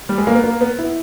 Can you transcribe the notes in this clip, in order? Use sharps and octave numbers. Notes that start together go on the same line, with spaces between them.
G3
G#3
A#3
B3
A#3
B3
E4